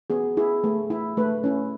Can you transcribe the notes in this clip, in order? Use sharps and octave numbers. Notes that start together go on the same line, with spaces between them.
B3 G#4
E4 G#4
A3
E4
A3 B4
C#4 E4